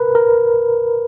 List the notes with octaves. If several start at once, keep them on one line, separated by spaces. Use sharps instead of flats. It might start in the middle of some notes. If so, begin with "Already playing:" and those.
Already playing: A#4 B4
A#4